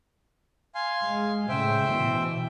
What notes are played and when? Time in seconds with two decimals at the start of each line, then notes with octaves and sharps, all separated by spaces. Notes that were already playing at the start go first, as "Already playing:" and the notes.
0.75 F5 G#5 C6
1.05 G#3
1.49 A2 C#3 C5 E5 G5
1.87 B2 E3